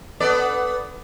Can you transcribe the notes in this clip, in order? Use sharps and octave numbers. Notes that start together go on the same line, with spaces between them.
B3 A4 D5